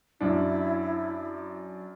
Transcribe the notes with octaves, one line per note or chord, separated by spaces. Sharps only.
F#2 D4 E4